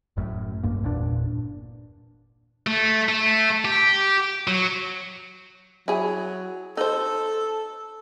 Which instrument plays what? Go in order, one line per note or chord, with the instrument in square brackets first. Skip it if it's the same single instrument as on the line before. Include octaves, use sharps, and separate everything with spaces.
[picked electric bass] F#1 F#2 A2
B1 G2 A#3
G1 E2 A#2 D4
[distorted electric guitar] A3
A3
G4
F#3
[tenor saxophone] F#3 [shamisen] E4 G#4
[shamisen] D#4 C5 [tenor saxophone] A4